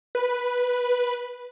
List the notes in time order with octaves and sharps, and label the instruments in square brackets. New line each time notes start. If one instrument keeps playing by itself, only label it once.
[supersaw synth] B4